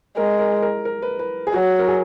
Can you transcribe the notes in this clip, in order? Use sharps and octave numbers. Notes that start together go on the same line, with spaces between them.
G#3 A#4
A#4
A#4
A#4
B4
B4
G#4
F#3 F#4
A#4
G#4